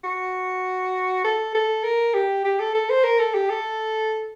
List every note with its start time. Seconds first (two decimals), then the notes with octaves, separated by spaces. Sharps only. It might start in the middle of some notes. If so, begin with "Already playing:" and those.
0.04 F#4
1.24 A4
1.55 A4
1.83 A#4
2.14 G4
2.45 G4
2.60 A4
2.75 A4
2.90 C5
3.04 A#4
3.19 A4
3.34 G4
3.50 A4